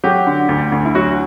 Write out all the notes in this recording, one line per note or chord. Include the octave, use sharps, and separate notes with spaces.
F#3 G4
D3
D2
D2
E4
F#3 F#4